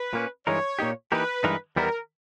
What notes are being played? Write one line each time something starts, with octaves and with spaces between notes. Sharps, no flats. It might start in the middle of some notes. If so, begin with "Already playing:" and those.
Already playing: B4
A#2 A#3 C#4
G2 E3 G#3 D#4 A#4 C#5
A#2 A#3 D#4 G4
E3 A#3 D#4 G4 A#4 B4
G2 E3 G#3 D#4 A#4
E2 D#3 G3 B3 E4 A#4